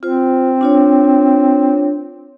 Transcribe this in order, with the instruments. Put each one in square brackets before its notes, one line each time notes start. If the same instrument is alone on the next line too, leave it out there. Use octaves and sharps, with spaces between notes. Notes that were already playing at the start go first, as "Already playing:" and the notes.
[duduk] C4 [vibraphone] F4 C5
[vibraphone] D4 F4 C#5